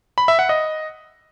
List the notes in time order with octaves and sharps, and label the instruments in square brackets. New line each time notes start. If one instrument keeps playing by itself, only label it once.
[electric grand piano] B5
E5
F#5
D#5